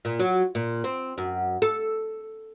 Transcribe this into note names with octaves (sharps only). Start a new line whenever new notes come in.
A#2
F#3
A#2
C4
F#2
A4